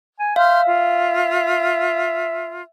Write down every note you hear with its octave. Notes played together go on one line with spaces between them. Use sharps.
G#5
E5 F5 C6 F6 G6
F4